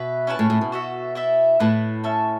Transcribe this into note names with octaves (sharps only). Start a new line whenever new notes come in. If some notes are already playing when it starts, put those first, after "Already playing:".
Already playing: B2 B4 E5
C#4 E4 B4 A5
A2
A2
B2
F#4 A4 E5
E4 A4 E5
A2 E4 B4 A5
C#4 A4 E5 A5